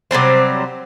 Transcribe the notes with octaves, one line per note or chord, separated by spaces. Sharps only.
C3 F#3 G3 C4